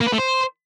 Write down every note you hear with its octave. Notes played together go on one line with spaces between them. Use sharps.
A#3
B4
A3
C5